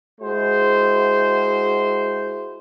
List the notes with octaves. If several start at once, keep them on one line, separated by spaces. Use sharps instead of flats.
G#3 E4 F#4 C5